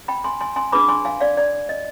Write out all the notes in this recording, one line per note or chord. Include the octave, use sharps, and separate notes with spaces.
G5 B5
G#5 C6
G#5 C6
G#5 C6
D4 G#4 B4 B5 D6
G#5 C6
F5 G#5
D5 F5
D5
D#5